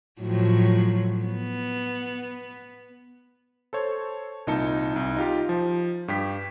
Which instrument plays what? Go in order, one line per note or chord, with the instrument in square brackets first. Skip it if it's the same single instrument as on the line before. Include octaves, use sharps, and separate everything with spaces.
[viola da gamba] A2 F3 F#3
B3
[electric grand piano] A4 C5 C#5
C2 A#2 D#4 A5 C#7
C2 D#4
D#4 F4 G4
F3
G2 G4 B6